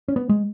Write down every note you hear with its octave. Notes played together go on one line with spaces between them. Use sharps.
C#4
B3
G#3